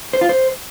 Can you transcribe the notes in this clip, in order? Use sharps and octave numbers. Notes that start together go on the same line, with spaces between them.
C5
F4
C5